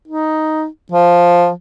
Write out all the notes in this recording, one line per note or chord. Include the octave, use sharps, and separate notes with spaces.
D#4
F3